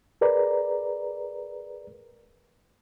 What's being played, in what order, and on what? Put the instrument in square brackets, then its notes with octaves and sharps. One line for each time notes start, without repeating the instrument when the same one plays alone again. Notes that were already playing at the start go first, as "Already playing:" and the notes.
[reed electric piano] G#4 A#4 B4 D5 A#5